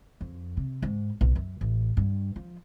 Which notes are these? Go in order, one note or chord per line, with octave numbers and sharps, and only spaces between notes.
F2
C3
G#2
B1
F#2
A1
G2
F3